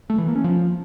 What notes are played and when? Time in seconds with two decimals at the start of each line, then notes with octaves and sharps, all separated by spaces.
0.10 A3
0.18 E3
0.27 A#3
0.36 C#4
0.44 F3